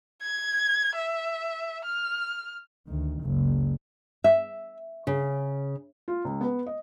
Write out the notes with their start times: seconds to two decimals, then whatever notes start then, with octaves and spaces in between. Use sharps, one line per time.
0.22 G#6
0.95 E5
1.85 F6
2.87 D2 D#3
3.22 F#1 C#2
4.24 E5
5.07 C#3
6.08 F4
6.25 C#2
6.41 B3
6.66 D#5